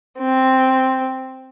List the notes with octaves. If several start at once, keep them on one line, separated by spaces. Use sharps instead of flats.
C4